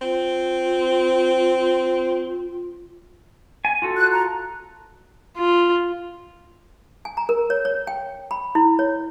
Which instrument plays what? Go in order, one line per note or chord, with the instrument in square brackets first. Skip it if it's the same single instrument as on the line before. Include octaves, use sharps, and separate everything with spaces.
[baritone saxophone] C4 [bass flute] F4
[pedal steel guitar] G#5
F4 F#4 A4
[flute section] F#6
A#5
[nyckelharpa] F4
[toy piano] G#5
A#5
A#4
C#5
C#5
G5
B5
E4
C#5